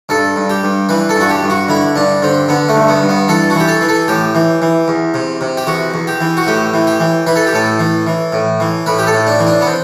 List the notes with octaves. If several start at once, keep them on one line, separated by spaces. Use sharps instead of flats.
G2 A4
G2
G4
G2
E3 B4
A4
G2 F#4
G4
G2
F#4
D3 E4
G2 D4
D3 C4
D3 B3
A3
G2
B3
G2
B3
E3 A4
F#4
E3 G4
A4
E3
A4
A2 G4
E3
E3
E2
C3
C3
G4
E2 F#4
E2
G4
E3
F#4
A2 G4
E3
G4
E3
E3 B4
A4
G4
A2 A4
E3
E3
A2
E3
A2 B4
G4
A4
A2
D4
E3
D4
B3
C4